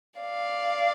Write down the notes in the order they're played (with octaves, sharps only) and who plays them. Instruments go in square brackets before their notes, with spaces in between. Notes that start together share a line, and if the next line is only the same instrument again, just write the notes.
[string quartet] D5 F5